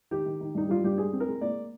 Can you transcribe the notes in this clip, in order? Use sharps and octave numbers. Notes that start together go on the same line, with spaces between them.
D#3 G4
D#3
D#3
G2 D#4
G3 F4
G2 G4
G#3 G#4
C4
A#4
G#3
A#3 D5